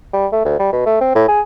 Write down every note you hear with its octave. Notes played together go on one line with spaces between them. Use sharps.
G3
A3
D2
G3
B2
A3
C4
A2
G#4